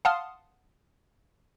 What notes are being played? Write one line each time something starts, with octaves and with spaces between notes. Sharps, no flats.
F5 F#5 A5 C6 D#6 F6